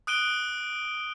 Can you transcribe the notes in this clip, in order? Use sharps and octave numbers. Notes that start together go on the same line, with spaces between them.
D#6 F#6 D7 D#7 G7